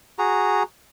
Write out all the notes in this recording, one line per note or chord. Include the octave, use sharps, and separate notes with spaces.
F#4 G#4 A#5